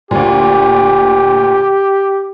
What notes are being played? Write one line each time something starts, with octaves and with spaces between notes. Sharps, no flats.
D2 A#2 G4